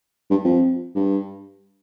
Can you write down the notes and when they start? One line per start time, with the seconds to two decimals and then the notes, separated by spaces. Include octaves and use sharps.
0.31 G2
0.45 F2
0.95 G2